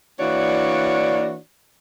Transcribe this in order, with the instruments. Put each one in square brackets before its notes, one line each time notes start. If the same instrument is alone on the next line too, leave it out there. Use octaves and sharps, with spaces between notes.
[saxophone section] E3 A#3 D4 F#4 C#5 D5